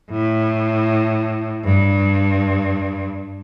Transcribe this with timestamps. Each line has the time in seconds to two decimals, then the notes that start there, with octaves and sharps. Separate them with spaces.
0.11 A2
1.65 G2